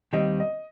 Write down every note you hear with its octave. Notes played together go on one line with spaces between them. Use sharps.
D#2 D#3 G3 C4 G4 D#5
D#5